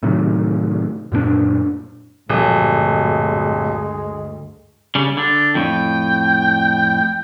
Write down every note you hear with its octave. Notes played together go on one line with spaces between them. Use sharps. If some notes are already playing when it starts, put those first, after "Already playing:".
A2 C3 D#3 F#3
F#2 A#2 A#3 D4
D1 D2 G2 A#2 F3 G3 G#3
C#3 G3
D3 D4
F2 A2 G5